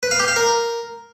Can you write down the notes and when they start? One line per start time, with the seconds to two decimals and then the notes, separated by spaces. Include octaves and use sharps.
0.03 B4
0.11 F5
0.20 G4
0.28 F5
0.36 A#4